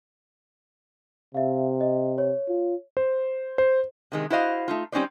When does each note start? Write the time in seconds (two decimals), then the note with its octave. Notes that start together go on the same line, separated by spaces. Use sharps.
1.34 C3 E5 F5
1.81 D#5
2.18 C#5
2.49 F4
2.97 C5
3.58 C5
4.12 C3 D#3 G#3
4.30 E4 F#4 C5 D#5 F5
4.68 A3 D#4 F4
4.92 G3 C4 C#4 D#4 C5 D5